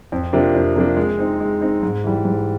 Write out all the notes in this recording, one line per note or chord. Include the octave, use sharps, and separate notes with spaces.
F2
C3 F3 A#3 D4
F2
C3 F3 A#3 D4
G#3
C4 D#4
G#3
C4 D#4
G#2
E3 G3
G#2